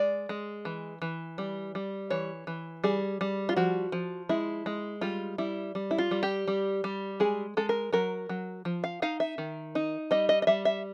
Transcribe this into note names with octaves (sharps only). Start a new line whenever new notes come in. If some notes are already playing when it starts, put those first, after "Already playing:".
Already playing: G#3 D5
G#3
E3
E3
G3
G3
E3 C#5
E3
G3 G#4
G3
F4
F3 F#4
F3
G#3 E4
G#3
G3 F4
G3 E4
G3
E4
F4
G3
G4
G3
G3
G#3 G#4
G#3 A4
A#4
F#3 A#4
F#3
F3
F5
D#4 F5
E5
D#3
D#4
G3 D#5
D#5
D#5
G3 E5
E5